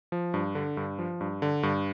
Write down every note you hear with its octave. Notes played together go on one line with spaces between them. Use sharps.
F3
G2
D3
G2
F3
G2
D3
G2